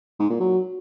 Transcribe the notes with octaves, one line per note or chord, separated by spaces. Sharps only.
G#2
A#2
F#3